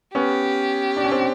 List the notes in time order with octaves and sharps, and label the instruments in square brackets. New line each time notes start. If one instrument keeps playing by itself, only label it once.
[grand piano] B3 C#4 [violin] G4
[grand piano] D4
C#4
C4 D4